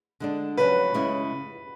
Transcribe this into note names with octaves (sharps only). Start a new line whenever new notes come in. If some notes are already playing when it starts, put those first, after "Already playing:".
D3 G#3 D4
C#3 F#3 C#4 B4
C#3 G#3 C#4 E4